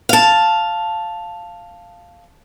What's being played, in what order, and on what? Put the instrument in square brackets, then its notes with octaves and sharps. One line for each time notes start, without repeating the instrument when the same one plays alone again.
[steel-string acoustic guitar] F5 A5